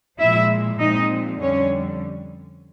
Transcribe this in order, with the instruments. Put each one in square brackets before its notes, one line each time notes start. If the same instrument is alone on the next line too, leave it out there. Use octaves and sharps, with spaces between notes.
[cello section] A#2 F3 G#3 E4 E5
A#2 F3 G#3 C4 D#4 D#5
F2 D3 G3 C#4 C#5